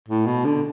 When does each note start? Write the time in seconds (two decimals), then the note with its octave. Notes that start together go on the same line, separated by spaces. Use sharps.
0.08 A2
0.26 B2
0.45 D3